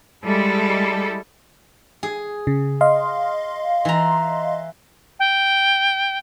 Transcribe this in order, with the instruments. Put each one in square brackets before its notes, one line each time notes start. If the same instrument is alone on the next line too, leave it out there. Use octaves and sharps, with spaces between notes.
[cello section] G3 G#3 E4 A4
[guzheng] G#4
[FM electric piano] C#3
D#5 F5 C6
[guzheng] E3 A#5
[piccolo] G5